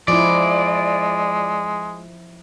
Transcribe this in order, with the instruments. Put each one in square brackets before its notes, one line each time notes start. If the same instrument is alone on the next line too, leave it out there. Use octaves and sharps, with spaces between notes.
[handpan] F3 E4 [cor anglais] G#3 [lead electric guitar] D5